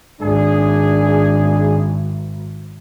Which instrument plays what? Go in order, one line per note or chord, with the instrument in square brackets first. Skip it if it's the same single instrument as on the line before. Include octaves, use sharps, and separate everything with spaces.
[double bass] G#1 [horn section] D4 G#4